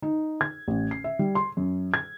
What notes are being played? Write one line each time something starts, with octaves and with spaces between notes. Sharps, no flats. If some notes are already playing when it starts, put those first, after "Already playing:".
D#4
G#6
A1
C7
E5
G3
C6
F#2
G#6